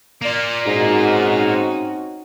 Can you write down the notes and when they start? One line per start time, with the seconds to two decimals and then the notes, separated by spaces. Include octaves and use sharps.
0.22 A#3 F4 D5
0.66 G#2 C4 C#4 D#4 F#4